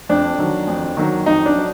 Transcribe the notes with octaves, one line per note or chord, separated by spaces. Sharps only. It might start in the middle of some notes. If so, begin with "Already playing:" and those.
F2 D4
D#3 F#3
F2
D#3 F#3
F2 D#4
D4
F#3